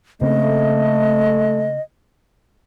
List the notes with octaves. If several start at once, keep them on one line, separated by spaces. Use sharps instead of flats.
C#3 A3 A#3 C4 D#5